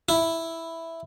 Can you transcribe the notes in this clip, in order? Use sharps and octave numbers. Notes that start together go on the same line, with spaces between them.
E4